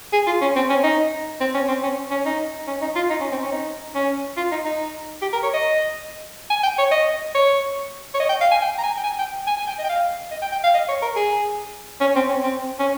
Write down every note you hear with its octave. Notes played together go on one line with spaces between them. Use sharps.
G#4
F4
C#4
C4
C#4
D#4
C4
C#4
C4
C#4
C#4
D#4
C#4
D#4
F4
D#4
C#4
C4
C#4
D#4
C#4
F4
D#4
D#4
G4
A#4
C#5
D#5
G#5
G5
C#5
D#5
C#5
C#5
D#5
G5
F5
G#5
G5
A#5
G#5
G5
G#5
G5
G#5
G#5
G5
D#5
G5
F5
D#5
G5
G5
F5
D#5
C#5
A#4
G#4
C#4
C4
C#4
C4
C#4